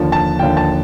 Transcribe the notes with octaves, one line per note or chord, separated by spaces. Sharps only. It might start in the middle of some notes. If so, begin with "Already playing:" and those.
Already playing: D#2 D3 F3 A5
A5
D#2 D3 F3 G5
A5